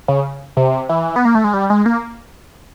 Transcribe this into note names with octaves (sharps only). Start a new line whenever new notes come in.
C#3
C3
E3
B3
A#3
A3
G#3
G3
G#3
A#3